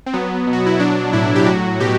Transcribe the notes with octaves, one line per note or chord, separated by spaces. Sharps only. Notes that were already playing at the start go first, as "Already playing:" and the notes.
C4
F#3 B3
B2
F#4
E4
F#3 D4
A2 E4
G4
F#3 F#4
B2 G4